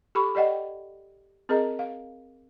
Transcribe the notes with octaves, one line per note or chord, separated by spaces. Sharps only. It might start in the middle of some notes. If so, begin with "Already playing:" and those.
G4 A4 B5 C#6 D6
G4 D5 D#5 F#5 G5
C4 G#4 A#4 D#5 A#5
F5